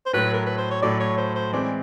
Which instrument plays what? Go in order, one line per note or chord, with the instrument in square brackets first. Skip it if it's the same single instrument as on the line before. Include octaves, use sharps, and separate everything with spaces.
[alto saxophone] C5
[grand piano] A2 F#3 A3 [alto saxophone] B4
[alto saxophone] A#4
B4
C5
C#5
[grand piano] A2 F#3 A3 [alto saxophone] D5
[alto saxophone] C#5
C5
C5
[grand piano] E3 G#3 C4 [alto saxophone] D5